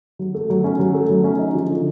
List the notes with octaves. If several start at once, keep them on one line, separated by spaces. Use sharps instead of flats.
F#3
A3
F#3
C#4
F#3
A3
F#3
C#4
D#4
F3
D3